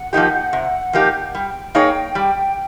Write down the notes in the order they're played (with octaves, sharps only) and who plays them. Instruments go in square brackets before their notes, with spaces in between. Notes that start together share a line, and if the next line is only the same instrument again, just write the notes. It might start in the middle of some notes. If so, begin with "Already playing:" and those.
Already playing: [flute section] F#5
[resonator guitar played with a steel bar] F3 A#3 D#4 G4
C3
F3 A#3 D#4 G4
[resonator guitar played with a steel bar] G3 [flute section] G5
[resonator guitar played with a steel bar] A#3 D#4 G#4 C#5
G3